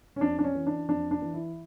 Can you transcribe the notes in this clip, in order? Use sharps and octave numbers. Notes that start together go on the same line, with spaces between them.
C#4
F2 D4
D4
C#4
E3
D4
F2 D4
D4
E3
E4